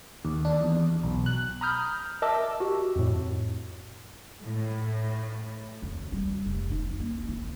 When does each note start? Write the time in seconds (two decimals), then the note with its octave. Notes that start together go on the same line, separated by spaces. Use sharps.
0.25 D#2
0.45 D4
0.62 E2
1.03 B1
1.26 F#6
1.61 A#5 B5 D#6 F6 G6
2.22 A#4 D#5 E5 A5 D6 E6
2.60 F#4 G4
2.96 F2 A2
4.44 A2
5.82 F2
6.12 G3
6.46 F1
6.71 D#4
7.00 A#3
7.28 F4